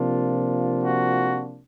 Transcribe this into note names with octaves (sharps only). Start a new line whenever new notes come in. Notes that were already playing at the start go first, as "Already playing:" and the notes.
Already playing: C3 F3 A#3 D4 F4
F#4